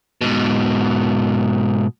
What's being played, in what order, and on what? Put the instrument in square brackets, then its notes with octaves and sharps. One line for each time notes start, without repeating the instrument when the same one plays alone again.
[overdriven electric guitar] G#2 B2